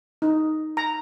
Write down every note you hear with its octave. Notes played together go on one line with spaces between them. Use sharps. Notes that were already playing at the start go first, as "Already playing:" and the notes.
D#4
A#5